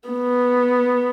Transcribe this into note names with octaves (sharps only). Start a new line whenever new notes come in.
B3